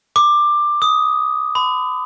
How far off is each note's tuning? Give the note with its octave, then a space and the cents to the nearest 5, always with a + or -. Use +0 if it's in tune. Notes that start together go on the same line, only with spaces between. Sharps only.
D6 +15
D#6 +10
B5 +40